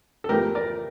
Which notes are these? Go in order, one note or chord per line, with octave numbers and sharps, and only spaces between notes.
A4
F2 E3 A3 G4 A#4
A#4 D5